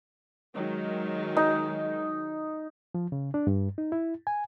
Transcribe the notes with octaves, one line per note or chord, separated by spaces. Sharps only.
D#3 F#3 G#3
D#4
F3
C#3
D4
G2
D#4
E4
G#5